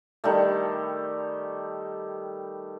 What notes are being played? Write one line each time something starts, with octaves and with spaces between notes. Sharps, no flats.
D#3 G3 A3